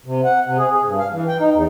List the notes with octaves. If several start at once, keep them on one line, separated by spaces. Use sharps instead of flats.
C3
F#5
C3
G#4
G#4
G2
F5
E3
G5
D#4
E2